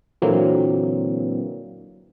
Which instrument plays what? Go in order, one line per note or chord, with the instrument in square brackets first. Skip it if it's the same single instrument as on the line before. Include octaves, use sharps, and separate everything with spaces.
[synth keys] A#2 D3 E3 F#3 A#3 C4